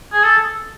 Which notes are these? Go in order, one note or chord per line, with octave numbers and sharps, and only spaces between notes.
G#4
A4